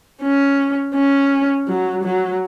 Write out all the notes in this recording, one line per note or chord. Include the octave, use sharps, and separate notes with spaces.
C#4
C#4
F#3
F#3